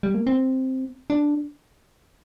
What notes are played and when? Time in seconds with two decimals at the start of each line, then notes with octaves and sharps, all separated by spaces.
0.03 G3
0.14 A#3
0.27 C4
1.10 D4